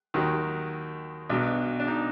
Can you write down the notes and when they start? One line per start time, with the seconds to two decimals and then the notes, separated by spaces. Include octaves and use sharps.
0.14 D#2 D#3 F#3
1.29 B1 B2 F#3 D4
1.80 D4
1.88 D#4